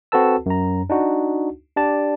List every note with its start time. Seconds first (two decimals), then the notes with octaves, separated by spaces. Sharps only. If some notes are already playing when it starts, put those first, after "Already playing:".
0.12 C4 F#4 A4 B4 A5 E6
0.46 F#2 A#5
0.90 D4 D#4 F#4
1.77 D4 G4 D5 A5